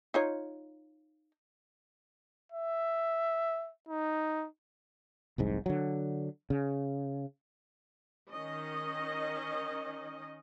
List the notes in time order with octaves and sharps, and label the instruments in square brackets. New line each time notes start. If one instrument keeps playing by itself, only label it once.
[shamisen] D#4 F4 C#5
[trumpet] E5
D#4
[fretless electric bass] F1 C2 G#2
D3 F#3
C#3
[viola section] D#3 C#4 D#5